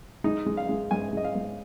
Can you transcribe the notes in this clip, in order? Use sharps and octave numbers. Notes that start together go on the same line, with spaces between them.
G#3 D#4
G#3
F5
G#3
G#2 G#5
G#3 D#5
F5
G#2